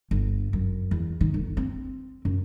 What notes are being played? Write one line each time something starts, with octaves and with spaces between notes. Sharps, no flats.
G1
F#2
E2
D#3
G1
C4
F#2